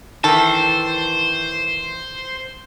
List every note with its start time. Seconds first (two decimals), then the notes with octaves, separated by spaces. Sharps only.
0.24 D#3 E3 A4 C5